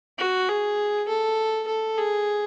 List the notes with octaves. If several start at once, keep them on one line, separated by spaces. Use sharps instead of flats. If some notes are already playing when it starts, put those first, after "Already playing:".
F#4
G#4
A4
A4
G#4